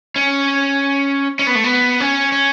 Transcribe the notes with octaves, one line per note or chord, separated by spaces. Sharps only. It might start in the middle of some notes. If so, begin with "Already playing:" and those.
C#4
C#4
B3
A3
B3
C#4
C#4